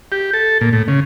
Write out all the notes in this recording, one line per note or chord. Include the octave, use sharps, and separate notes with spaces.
G4
A4
A#2
A2
C#3